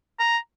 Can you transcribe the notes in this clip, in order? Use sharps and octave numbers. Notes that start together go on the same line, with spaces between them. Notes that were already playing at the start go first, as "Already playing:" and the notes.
A#5